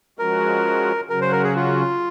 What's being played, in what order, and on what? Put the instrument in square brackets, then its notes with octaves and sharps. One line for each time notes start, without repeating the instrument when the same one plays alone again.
[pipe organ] F3 G#3 C#4 F#4 [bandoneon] A#4
[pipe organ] C#3 F#3 C#4 F#4 [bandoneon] A#4
[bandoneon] C5
A#4
G#4
F4